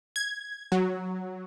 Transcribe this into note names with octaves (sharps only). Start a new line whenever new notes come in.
G#6
F#3